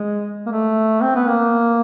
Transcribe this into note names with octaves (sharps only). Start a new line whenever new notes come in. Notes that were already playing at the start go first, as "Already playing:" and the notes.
Already playing: G#3
A#3
A3
C4
B3
A#3